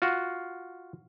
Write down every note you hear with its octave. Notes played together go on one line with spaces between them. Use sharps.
F4 F#4